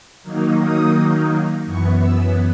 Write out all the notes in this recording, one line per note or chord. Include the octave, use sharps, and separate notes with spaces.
D#3 F#3 A#3 D#4
D#6
F#2 E3 B3 C#6
E6